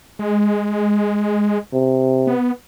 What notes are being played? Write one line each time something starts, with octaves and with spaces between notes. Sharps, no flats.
G#3
C3
B3